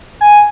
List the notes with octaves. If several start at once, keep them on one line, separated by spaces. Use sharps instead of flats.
G#5